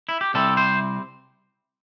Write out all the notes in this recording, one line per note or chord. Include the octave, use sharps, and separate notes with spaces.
E4
G4
C2 C3 G3 C4 A4
C5